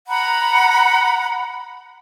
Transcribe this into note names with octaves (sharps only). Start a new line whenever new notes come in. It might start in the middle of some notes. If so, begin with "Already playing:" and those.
F#5 A#5 B5